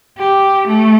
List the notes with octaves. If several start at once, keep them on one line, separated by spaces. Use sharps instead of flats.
G4
A3